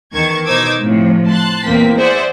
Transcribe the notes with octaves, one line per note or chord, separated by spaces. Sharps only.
E2 D#3 A5 C#6 G#6
B2 D#4 C5 D6 E6 G#6
A2 C3 F3
A5 C6 F#6
E2 A#2 A#3 C4 B6
G#4 C5 D5 E5 F#5